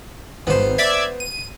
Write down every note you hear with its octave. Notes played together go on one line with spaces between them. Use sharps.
G#1 B3 C5
D5 E5 G#6
D#7